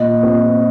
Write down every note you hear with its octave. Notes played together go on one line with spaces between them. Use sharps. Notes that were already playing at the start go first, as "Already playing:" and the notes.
Already playing: A#2 D#5
F3 C4 C5